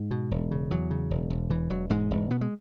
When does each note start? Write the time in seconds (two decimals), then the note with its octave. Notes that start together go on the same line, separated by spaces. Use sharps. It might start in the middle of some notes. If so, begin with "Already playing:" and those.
Already playing: G#2 G#3
0.11 B2
0.31 E1
0.51 C#3
0.71 E2 F#3
0.91 C#3
1.11 E1
1.30 E1
1.50 E1 E3
1.70 E1 F#3
1.90 E1 G#2 G#3
2.11 E1
2.30 B2 B3
2.41 G#3